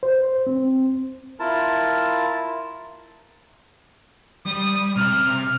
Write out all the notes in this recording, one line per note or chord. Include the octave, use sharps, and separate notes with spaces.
C5
C4
E4 F4 A#4 A5
G3 D#6
C3 A#5 F6